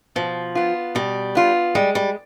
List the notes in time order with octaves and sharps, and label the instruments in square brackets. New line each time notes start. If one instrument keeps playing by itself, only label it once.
[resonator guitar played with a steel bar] B2 [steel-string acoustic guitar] F3
[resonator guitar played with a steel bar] B3 F4
[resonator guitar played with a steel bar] B2 [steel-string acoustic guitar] G3
[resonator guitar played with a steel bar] B3 F4
[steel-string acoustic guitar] G3 [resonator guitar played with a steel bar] G#3
[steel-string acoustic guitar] G3